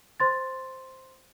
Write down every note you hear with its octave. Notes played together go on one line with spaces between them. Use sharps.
C5 C6 A6